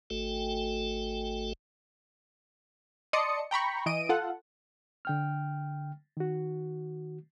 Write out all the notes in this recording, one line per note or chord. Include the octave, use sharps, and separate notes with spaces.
G#1 A3 F#4 A4 G5
D5 D#5 A5 C6 D#6 C#7
G5 A#5 B5 C#6
E3 D#5 D7 D#7
F4 A4 F#5
D3 G5 F6
D#3 F#4